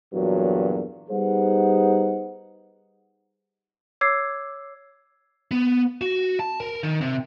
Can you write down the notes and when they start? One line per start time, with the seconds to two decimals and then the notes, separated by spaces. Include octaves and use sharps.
0.13 E2 G2 A#2 F#3
1.11 G3 B3 D#4 G#4 C5 F#5
4.01 C#5 D6 E6 G#6 C7
5.51 B3
6.01 F#4
6.39 A5
6.60 A#4
6.83 D#3
7.01 C3